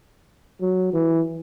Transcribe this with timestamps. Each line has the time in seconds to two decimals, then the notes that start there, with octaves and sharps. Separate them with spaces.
0.61 F#3
0.93 E3